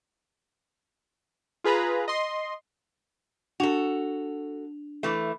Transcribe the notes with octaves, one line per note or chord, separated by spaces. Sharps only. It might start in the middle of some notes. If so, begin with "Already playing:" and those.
F4 G#4 B4 A#5 B5
D#5 C6
D4 F#4 A4 F7
E3 A3